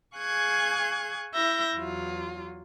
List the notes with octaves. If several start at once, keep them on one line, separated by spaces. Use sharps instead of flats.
G#4 F5 G#5 C#6 F#6 G#6
E4 E5 G6 A#6
E2 F#3 F4